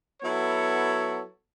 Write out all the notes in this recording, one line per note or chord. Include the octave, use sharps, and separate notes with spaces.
F#3 B3 E4 A4 C#5